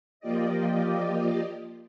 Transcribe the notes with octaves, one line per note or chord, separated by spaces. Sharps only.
F3 A#3 F4 G4 D5 D#5